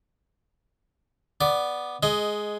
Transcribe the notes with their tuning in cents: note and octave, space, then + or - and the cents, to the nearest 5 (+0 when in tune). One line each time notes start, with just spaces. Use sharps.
B3 +0 D5 +0
G#3 +10 D#5 +0